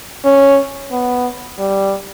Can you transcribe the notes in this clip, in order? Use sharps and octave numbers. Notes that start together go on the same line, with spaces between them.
C#4
B3
G3